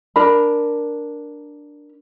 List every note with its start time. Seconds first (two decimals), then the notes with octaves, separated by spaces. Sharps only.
0.16 D4 A#4 B5